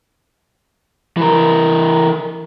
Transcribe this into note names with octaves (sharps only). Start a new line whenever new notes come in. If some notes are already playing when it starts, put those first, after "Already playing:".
E3 A#4